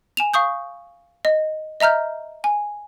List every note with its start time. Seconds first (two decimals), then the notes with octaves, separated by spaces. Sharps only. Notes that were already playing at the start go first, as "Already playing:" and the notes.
0.17 G#5 E7 F7
0.34 F5 C#6 D#6 G6
1.25 D#5
1.80 D#5 E5 A#5 F6 G6
2.44 G#5